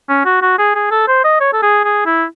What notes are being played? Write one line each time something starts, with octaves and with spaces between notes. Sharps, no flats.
C#4
F#4
F#4
G#4
G#4
A4
C5
D#5
C#5
A4
G#4
G#4
E4